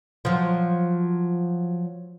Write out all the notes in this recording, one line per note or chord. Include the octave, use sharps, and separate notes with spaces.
F3 F#3